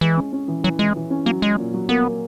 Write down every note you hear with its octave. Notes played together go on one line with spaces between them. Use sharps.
E3 G#3
C#4
C#4
E3
E3 F#3
E3 G#3
E3
C#4
F#3 A#3
F#3 G#3
A#2
F#3
A#3 B3
A#3